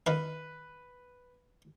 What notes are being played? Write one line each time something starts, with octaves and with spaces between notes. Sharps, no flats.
D#3 B4 F5